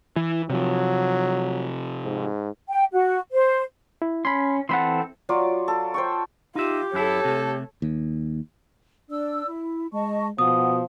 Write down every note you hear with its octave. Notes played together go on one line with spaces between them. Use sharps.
E3
C3 F3 F#3
G#2
G5
F#4
C5
E4
C#4 B5 C6
E3 C4 A4 F#5 B5 C6
F#3 F4 F#4 D5
A4
C5 G5 C#6
D#4 F4 G4 E5
F#2 E4 A4 C#5
C3 A3
D#2
D4 D5 E6
E4
G#3 D#5 A5 C#6
B2 F3 F#5 D#6